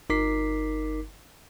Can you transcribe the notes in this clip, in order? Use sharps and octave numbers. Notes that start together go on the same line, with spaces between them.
G1 D#4 A#4 D6 B6 C7